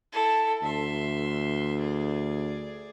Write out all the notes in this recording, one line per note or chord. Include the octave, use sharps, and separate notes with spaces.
E4 A4
D2 E5 C6
G#4 D5